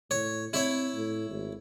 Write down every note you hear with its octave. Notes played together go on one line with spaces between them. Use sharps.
A2 C#5
C4 E4 C#5
A2
G#1